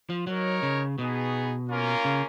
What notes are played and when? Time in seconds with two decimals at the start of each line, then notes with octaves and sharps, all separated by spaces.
0.10 F3
0.27 F#3 D#4 A#4 C#5
0.63 C#3
0.98 B2 B3 D#4 G#4
1.70 A#3 C#4 F4 A#4
2.05 C#3